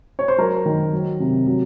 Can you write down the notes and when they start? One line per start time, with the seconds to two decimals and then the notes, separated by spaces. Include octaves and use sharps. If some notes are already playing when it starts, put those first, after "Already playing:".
0.19 C#5
0.28 C5
0.38 F#3 A#4
0.66 D#3
0.93 F#3
1.20 C3
1.47 F#3